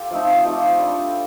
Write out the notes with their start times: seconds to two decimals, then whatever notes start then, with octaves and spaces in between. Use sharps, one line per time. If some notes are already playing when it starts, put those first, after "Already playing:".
Already playing: F4 G4 A4
0.11 F3 A3 C4 D#4
0.44 F3 A3 D#4 G4
0.79 G3 D4 A4